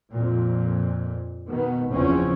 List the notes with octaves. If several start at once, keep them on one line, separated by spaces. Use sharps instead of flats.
F2 A#2
B2 D#3 B3
F#1 E2 C#3 F3 C4 C#4